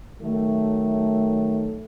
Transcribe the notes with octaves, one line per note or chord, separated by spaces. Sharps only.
D#3 F#3 A3